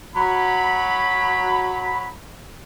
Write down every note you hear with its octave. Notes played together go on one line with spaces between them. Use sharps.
F#3 B5